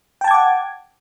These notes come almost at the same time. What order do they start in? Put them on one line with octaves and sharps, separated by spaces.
G5 A5 G#6 D6 F#5